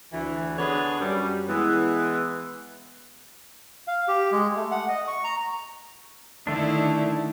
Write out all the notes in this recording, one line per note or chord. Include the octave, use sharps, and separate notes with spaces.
D2 E3
D3 B3 D4 G#4 B4 C#5
F#2 G3 C#4
E3 G#3 B3
F5
G4
G#3
A3
F#5
D#5
C#6
A#5
D3 D#3 A3 D4 E4